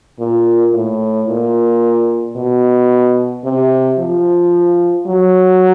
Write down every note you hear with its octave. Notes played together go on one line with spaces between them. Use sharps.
A#2
A2
A#2
B2
C3
F3
F#3